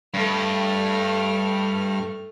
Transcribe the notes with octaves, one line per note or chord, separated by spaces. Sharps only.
G2 A3 F6